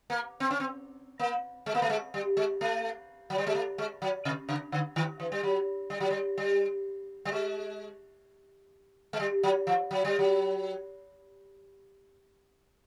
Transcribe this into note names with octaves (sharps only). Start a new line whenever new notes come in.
A#3
C4
C#4
C4
A#3
G#3
A#3
A3
G#3
G3
G#3
A3
F#3
G3
G#3
A3
G#3
F#3
C3
C#3
D3
D#3
E3
G3
F#3
G3
F#3
G3
G3
G3
G#3
G#3
G3
F#3
F3
F#3
G3
F#3